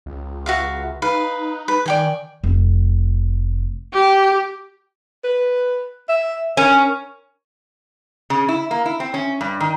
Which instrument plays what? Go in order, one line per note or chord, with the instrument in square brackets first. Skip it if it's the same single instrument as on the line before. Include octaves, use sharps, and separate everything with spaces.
[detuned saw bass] C#2
[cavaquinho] F#4 E5 F5
[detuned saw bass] D#4 [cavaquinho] B4 F5
[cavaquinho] B4
[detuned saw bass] D#3 [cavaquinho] D5 G5 G#5
[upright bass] F1
[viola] G4
[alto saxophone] B4
E5
[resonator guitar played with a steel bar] C#4 [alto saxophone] A#4
[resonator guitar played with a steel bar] C#3
E4
A#3
E4
C4
C#4
G2
D#3